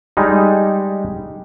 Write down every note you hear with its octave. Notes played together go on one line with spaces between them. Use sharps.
G3 G#3 D#4